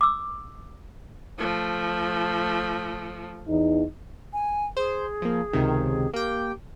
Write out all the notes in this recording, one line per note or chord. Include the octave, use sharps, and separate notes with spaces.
D6 E6
F3 A3
E2 D#4
G#5
G#4 C5
F3 A#3
C#2 C3 D#3
A#3 G4 G5